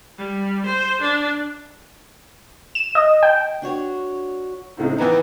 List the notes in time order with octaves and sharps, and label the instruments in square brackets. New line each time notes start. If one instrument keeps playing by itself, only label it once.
[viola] G3
C5
D4
[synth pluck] E7
D#5
G5
[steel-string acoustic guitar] D4 F#4 C#5
[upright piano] C#2 A2 C4 [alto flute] D#4
[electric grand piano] E3 B3 D#4 [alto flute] B4 [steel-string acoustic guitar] C5 G#5 [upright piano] G5 A#5